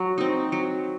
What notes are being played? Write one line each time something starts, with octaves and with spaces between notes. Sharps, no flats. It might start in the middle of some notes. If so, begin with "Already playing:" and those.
Already playing: F#3
C4 D#4
F#3